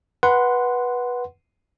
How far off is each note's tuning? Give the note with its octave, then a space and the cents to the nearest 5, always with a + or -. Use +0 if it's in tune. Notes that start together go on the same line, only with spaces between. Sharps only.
B4 -15 F#5 +0 C6 -15